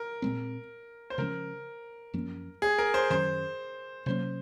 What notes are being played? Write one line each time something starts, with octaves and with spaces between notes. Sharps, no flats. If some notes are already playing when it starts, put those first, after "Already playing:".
Already playing: A#4
A#2 G#3 C4
C5
C#3 F3 G#3 C#4 A#4
F#2 F3 A#3 C#4
G#4
A#4
C5
F#2 D#3 F#3 C#4 C5
C3 F#3 A#3 C#4 C5